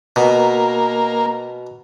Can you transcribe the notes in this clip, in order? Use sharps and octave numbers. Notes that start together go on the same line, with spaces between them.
B2 A#3